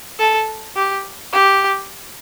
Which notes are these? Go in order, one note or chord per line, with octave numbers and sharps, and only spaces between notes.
A4
G4
G4